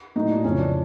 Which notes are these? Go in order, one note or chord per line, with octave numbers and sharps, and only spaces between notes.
A2 F#3 D#4
D4
F2 C#3 E3 C#4
D4